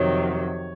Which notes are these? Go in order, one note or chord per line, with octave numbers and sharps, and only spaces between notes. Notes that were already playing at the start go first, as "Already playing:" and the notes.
Already playing: F2 C3 D#3 F#3 C#5